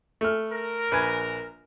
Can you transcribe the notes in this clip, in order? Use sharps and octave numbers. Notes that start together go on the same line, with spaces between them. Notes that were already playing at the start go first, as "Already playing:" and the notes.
A3 F6
A#4
A#1 B4 G#5